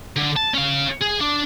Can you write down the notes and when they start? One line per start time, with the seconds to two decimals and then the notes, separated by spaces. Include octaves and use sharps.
0.16 D3
0.37 A5
0.54 C#4 F5
1.01 G#4
1.20 D4